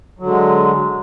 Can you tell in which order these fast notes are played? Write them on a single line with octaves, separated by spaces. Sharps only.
F#3 D3 G#3